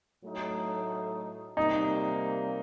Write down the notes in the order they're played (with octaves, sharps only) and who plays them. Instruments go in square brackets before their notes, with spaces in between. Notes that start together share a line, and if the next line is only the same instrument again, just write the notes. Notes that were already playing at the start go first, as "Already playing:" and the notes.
[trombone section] A2 F#3 A3 D#4
[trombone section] C3 G3 A#3 [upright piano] D#4